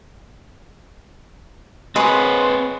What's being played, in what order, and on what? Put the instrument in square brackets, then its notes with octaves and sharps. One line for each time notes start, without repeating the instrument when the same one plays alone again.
[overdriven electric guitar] C4 B4 [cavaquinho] G#4 C#5 [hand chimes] D#5 B5 F#6 [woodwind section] C6